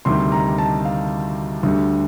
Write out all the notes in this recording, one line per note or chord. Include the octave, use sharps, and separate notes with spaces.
D2 C3 D#3 G3 C6
A#5
A5
F5
D2 D3 G3